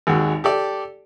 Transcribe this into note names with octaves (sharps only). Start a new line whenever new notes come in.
G#1 D#2 G#3 F#4
G4 A4 D5